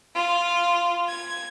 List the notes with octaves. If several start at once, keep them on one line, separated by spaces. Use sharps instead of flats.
F4
G#6